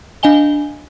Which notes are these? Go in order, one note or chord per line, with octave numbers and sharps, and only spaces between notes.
D4 D#5 F5 G#5 G7